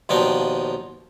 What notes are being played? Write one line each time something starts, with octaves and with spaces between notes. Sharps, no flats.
D#2 B2 F3 D4 D#4 G5